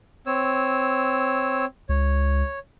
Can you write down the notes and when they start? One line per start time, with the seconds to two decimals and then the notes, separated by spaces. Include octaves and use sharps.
0.26 C4 C#5 E6
1.89 C#2 C#5